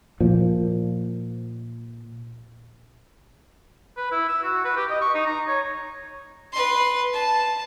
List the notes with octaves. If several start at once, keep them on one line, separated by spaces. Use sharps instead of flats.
A#2 F3
B4
E4
E6
F#4
B4
G4
D#5
C#6
D#4
A#5
C#5
B4 C6
A5